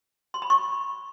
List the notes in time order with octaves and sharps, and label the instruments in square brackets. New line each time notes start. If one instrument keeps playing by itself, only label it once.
[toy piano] C6
B5
C#6